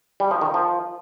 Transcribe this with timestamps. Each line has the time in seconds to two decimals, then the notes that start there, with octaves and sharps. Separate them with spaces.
0.20 G3
0.31 F3
0.41 D#3
0.54 F3